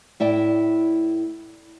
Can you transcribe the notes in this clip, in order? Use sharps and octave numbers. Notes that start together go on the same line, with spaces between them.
A2 E4 D5 G5